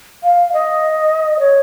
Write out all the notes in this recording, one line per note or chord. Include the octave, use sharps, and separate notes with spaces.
F5
D#5
C#5